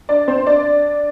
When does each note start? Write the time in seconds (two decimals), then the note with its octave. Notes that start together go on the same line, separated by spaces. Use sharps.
0.09 D4 D5
0.28 C4 C5
0.46 D4 D5